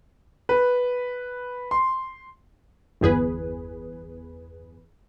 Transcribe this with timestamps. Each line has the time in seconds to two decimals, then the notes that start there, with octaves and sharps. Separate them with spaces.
0.49 B4
1.71 C6
3.01 G1 E2 G#4 B4